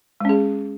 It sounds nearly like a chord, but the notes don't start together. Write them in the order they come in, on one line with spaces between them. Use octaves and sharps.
G#3 C#4 G#4